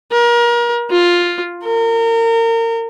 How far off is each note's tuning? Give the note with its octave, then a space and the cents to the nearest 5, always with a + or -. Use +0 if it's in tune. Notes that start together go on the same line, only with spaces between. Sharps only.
A#4 +35
F4 +5
A#4 -30